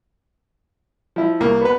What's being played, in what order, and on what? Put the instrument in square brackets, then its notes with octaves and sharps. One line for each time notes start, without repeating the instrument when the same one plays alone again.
[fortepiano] F3 E4
C2 A#3
B3 B4